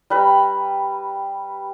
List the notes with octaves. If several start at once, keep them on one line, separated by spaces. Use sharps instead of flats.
G3 B4 A#5